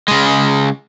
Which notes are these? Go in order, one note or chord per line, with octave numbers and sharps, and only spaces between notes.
C#3 G#3